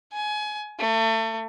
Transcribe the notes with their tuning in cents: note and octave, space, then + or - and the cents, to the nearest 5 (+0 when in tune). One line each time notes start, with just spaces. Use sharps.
G#5 +25
A3 +30